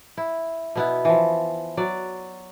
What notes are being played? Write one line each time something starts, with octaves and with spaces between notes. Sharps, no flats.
E4
B2 B3 E4
E3 F3
F#3 D5 F#5